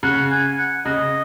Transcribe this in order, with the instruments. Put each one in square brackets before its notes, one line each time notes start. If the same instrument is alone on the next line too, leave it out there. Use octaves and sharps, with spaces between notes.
[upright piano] C#3 [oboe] F#5
[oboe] G#5
F#5
[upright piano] C#3 [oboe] D#5